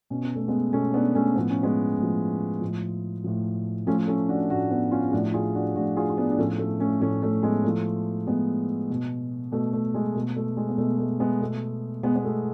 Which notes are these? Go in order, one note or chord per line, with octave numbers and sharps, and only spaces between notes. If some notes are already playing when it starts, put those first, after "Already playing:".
B2 C#4
B3
A3
G#3 B3
B2 A3 C#4
B3 D4
A3 C#4
A2 F3 B3
C#4
G#3 B3
A2 F3
A2 F3
A2 F3
A2 F3 A3 C#4
A3 C#4
D4 F#4
A2 F3 D4 F#4
B3 D4
C#4 F4
G#4
A2 F3 D4 F#4
F4 G#4
D4 F#4
A2 F3 D4 F#4
F4 G#4
F4
B3 D4
D4
A2 F3 A3 C#4
A3
A3 C#4
A2 F3 A3 C#4
A3 C#4
G#3 B3
A2 F3 A3
A2 F3 G#3 B3
B2
B2 A3
A3
G#3
B2 A3
A3
G#3
B3
B2 A3
A3
G#3 B3
B2 A3
B2 G#3 B3
B3
A3